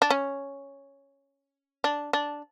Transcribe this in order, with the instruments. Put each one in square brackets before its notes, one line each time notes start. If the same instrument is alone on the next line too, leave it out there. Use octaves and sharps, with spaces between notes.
[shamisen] D4
C#4
D4
D4